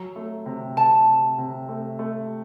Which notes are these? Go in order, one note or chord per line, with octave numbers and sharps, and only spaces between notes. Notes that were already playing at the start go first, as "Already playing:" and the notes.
Already playing: F#3 A#5
A3
C3
C3 A5
C3
C3
A3
A3